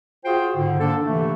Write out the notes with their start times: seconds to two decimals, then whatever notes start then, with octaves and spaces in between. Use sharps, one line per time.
0.25 F4 F#4 G#4 C5 G5
0.55 G#2 D3
0.79 A#3 D4 A4
1.05 C3 E3 A3